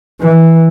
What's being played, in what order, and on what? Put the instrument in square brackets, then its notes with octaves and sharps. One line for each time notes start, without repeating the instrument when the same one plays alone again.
[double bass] E3